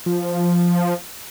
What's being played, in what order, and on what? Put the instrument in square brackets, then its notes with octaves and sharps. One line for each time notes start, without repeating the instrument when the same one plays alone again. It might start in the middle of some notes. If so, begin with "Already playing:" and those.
[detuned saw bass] F3